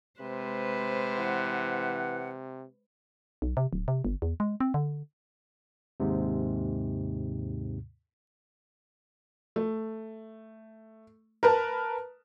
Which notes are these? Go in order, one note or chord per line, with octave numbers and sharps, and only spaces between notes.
C3 G#3 B4 C5
E3 F#5
B1
C3
D1
C3
G1
E2
G#3
C4
D3
D#2 G#2 C3
A3
A#4 B4 A5